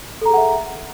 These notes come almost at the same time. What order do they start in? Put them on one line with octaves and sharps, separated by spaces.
A4 A#5 G#4 F#5 E5